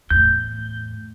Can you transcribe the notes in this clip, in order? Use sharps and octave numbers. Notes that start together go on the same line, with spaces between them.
E2 A2 G6